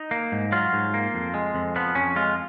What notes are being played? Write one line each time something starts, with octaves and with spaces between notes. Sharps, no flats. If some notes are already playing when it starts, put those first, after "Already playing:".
Already playing: D#4
A#3
G#2
F#3 F4
G#2
A#3
F2
G#3
F2
F3 B3
F2 C#4
G#3 F4